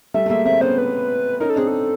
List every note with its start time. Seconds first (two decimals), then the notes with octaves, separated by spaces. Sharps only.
0.14 G3 A3 E5
0.26 A3
0.30 G#3 A#3 E5
0.45 A#3 C4 E5
0.61 B3 C#4 C5
0.78 B4
1.40 C#4 D#4 A#4
1.50 A4
1.56 C4 D4 G#4
1.67 A4